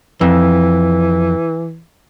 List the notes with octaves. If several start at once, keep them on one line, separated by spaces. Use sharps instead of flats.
F2 E3